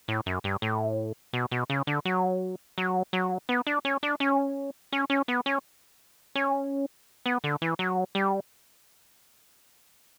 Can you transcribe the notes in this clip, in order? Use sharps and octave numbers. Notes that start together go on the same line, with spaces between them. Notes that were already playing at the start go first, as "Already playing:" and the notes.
A2
F#2
G2
A2
B2
B2
C#3
D3
F#3
F#3
F#3
B3
D4
C#4
D4
C#4
C#4
C#4
B3
C#4
C#4
B3
D3
E3
F#3
G3